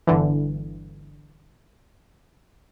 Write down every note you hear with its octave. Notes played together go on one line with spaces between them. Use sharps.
G1 D3 E3